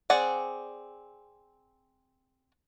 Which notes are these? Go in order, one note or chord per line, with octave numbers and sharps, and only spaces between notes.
C4 G#4 D5 F#5